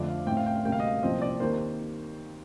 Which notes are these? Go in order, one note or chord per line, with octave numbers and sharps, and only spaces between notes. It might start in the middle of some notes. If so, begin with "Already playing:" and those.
Already playing: F2 D3 F3 A3 D5
F5
A2 A3 C4 G5
F5
G5
F5
D2 C3 G3 A#3 G5
F5
D#5
F5
C2 A#2 F3 C4 D#5
D5
D#2 D#3 A#3 C5